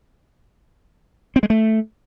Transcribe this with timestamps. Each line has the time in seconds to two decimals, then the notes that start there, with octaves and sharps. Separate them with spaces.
1.36 C4
1.43 G#3
1.50 A3